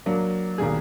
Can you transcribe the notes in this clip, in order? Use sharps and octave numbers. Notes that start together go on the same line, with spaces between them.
F#3 A#3 D4
B1 D#3 G3 A#3 G#4